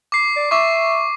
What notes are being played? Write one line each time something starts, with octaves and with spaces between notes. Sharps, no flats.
D6 C7
D5
E5 C#6 D6